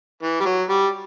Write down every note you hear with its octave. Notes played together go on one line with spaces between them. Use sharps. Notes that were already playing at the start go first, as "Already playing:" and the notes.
E3
G3
F#3
G3